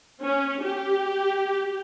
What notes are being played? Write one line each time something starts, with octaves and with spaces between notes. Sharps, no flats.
C#4
G4